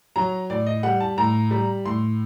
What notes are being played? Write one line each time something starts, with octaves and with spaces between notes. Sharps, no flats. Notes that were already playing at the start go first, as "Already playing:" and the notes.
F#3 A#5
A2 D5
D#5
G3 F#5
A5
A2 A#5
G3
A2 C6